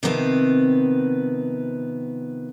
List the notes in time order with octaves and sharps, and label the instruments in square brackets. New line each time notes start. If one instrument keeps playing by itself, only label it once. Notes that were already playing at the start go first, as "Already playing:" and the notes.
[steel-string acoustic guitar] C3 D#3 F3 B3 C4